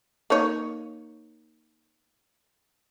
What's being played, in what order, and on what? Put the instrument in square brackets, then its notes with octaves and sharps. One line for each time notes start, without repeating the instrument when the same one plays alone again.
[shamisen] A#3 D#4 C#5